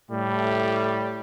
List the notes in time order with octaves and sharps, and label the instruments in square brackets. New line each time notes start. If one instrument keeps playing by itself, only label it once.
[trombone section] A2 [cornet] G3